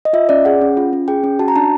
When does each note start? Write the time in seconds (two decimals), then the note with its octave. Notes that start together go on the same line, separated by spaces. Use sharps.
0.05 D#5
0.13 F4 E5
0.29 C#4 D5
0.45 G#4 F#5
0.61 C#4
0.77 F4
0.93 C#4
1.08 G#4 G5
1.24 C#4
1.39 F#4 A5
1.48 A#5
1.56 D4 A5